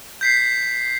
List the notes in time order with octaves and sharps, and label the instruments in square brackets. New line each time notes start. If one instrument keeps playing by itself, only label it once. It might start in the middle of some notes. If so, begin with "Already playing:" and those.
[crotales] G6 B6 C7